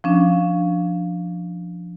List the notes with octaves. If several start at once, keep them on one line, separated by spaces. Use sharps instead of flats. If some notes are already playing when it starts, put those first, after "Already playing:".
F3 C#4 D4